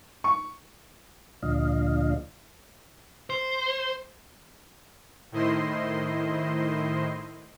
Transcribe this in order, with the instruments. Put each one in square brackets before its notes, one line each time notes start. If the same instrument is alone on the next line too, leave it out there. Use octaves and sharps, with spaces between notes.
[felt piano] C#6
[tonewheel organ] D2 A#2 F3 D4 D#5 F5
[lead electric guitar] C5
[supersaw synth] A2 D#3 E4 C5 D#5 C6